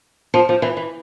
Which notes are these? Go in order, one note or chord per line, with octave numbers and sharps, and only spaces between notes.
F3
F3
E3
E3